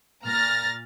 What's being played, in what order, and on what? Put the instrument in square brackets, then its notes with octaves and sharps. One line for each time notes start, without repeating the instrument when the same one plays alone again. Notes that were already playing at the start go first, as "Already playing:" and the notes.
[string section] A#2 A#5 F6 A6 A#6